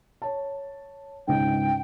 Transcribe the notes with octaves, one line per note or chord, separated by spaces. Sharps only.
C#5 A5
C#2 G#2 G5